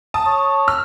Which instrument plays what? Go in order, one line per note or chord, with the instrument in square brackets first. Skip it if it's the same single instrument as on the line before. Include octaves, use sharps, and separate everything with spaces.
[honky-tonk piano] A5 D#6
[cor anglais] C#5
[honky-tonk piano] E6 F6